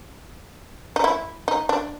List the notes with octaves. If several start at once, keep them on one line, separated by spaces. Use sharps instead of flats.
D#4
E4
D#4
D4